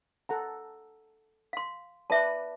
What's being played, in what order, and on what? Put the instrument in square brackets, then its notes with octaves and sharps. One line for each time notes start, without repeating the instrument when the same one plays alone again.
[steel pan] A4 F#5 A#5
[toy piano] F5 C6
[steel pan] B4 D5 B5 [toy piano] E5 A5